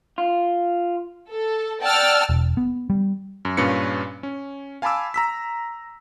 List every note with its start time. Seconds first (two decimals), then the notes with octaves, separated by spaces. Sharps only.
0.18 F4
1.30 A4
1.83 D5 F#5 G5 A5 E6 F6
2.29 E1
2.57 B3
2.90 G3
3.45 F#2
3.57 G2 A#2 C#4 F4 B4 C#7
4.23 C#4
4.82 F5 G#5 A5 B5 D6 E6
5.14 A#5 E6 B6